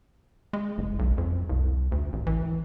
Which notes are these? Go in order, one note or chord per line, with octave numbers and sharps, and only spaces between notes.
G#3
F#1
B1
F2
C2
D2
A1
E3